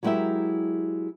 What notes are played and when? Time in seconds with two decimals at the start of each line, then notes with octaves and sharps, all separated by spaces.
0.03 F#3 G#3 E4 G4 A#4 E5